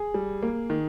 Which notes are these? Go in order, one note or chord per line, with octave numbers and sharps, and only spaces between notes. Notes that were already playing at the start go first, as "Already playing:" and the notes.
Already playing: G#4
G3
A#3
D#3